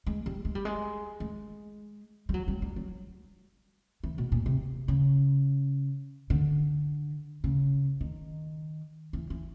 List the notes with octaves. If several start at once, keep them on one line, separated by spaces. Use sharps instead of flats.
G#3
G3
G#3
G3
G#3
G#3
G3
F#3
G3
G3
F#3
E3
B2
A#2
C3
C#3
D3
C#3
D#3
E3
E3